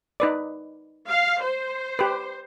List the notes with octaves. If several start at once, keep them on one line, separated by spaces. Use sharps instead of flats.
D#4 B4 D5
F5
C5
G4 B4